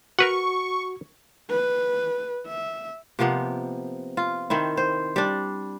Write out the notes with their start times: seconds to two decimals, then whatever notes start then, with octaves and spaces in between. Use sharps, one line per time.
0.19 F#4 A#4 B4 F#5 C#6
1.50 B4
2.47 E5
3.19 C3 F3 A#3 B3
4.17 F4
4.50 D#3 C4 E4
4.77 C5
5.16 G3 D4